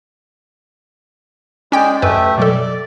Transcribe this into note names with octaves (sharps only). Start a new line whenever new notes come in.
G#3 C#4 G#4 D5 G5 G6
F#2 A3 G4 B4 E5
B2 F#3 A4 D5